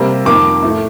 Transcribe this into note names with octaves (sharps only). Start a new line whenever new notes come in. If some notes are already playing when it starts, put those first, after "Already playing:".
Already playing: C3 G3 A#3
F2 D#3 A#3 D6
A2 A3